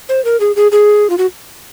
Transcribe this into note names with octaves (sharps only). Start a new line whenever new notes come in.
C5
A#4
G#4
G#4
G#4
F4
F#4